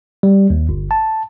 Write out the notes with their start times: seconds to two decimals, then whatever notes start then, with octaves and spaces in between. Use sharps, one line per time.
0.23 G3
0.50 D#2
0.69 G1
0.91 A5